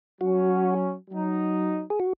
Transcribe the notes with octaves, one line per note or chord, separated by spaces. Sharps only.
F#3 C#4 F#4
F#3 D#4
G#4
F#4